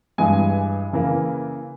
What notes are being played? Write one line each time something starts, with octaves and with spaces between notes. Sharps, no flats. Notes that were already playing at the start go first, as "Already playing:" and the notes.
G2 E3 G#3 G#5
C#3 E3 A#3